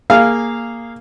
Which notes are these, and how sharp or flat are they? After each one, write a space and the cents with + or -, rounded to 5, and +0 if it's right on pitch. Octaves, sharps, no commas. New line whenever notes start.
A#3 +0 G#4 -10 F5 -10